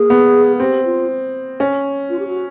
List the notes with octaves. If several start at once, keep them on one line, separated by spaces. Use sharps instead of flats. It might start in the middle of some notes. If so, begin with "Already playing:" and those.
Already playing: A#3 G#4
B3
C4 G4
F4
C#4
F4
G4
F#4